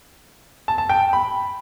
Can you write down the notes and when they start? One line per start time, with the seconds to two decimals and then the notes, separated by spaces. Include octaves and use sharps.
0.68 A5
0.78 A5
0.89 G5
1.13 B5